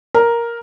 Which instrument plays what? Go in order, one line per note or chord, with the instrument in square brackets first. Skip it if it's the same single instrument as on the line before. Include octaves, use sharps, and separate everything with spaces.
[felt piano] A#4